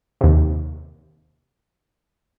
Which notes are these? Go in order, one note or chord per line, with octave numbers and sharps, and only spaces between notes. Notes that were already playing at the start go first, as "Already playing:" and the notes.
D#2 C3